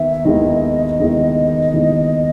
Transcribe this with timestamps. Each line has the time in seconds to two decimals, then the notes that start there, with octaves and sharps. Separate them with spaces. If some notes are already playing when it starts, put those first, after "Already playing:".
Already playing: D#2 D#3 B3 E5
0.25 D#2 D#3 G#3 B3 E4 D#5
1.00 D#2 D#3 G#3 B3 E4
1.74 D#2 D#3 G#3 B3 E4